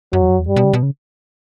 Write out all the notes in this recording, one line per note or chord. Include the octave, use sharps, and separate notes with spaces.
F#2 F#3
E2
F#2
E2
G2 G3
B2
C#3
B2
C#3